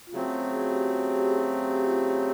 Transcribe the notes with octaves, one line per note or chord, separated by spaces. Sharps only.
F4
C#3 F#3 A3 C4 F#4
F#4
G#4
G4
F#4
G4
G#4
G4
F4
G4